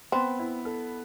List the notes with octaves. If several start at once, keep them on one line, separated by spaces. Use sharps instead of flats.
B3 C4
E4
A4